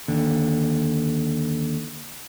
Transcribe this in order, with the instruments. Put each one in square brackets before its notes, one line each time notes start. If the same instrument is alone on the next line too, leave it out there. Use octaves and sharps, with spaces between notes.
[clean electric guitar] D#2 D3